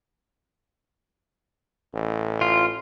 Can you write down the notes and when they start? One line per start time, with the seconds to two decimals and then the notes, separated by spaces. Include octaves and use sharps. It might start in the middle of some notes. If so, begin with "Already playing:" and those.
1.94 A1
2.41 F4